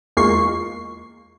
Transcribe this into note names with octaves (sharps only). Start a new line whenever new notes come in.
E2 G#3 A#3 F4 C#6 C7